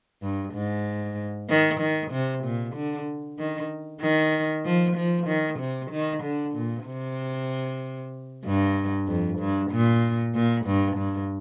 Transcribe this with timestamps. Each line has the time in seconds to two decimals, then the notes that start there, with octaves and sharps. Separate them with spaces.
0.22 G2
0.54 G#2
1.49 D#3
1.80 D#3
2.11 C3
2.44 A#2
2.75 D3
3.38 D#3
4.01 D#3
4.65 F3
4.96 F3
5.27 D#3
5.59 C3
5.91 D#3
6.23 D3
6.54 A#2
6.85 C3
8.45 G2
9.07 F2
9.38 G2
9.71 A#2
10.34 A#2
10.65 G2
10.96 G2